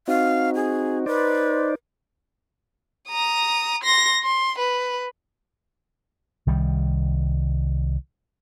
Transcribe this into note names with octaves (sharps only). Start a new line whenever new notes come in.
C4 D#4 F#4 F5
G#4
D#4 B4 C5 D5
A#5 D#6
C6 A#6
C6
B4
C2 D#3 G3